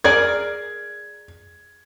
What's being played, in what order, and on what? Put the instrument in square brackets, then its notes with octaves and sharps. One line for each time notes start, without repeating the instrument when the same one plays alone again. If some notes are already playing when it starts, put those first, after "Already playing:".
[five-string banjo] G#4 A#4 D5 [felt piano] G#6